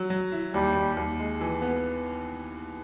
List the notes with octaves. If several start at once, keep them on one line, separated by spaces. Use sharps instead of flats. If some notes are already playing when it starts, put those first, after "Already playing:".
Already playing: F#3
F#3
E4
D#2 G3
D#2
D#2
G#3
E3
B3